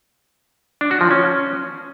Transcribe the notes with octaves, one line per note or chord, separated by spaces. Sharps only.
D4
F#4
F3
C#4